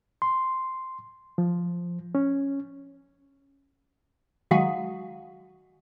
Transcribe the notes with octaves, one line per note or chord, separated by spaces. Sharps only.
C6
F3
C#4
D#3 F#3 G#3 F#4 F5 F#5